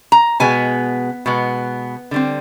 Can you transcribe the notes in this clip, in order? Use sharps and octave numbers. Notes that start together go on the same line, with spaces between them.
A#5
B2 G#3 B3 G#5
B2 G#3 B3
D3 G3 C4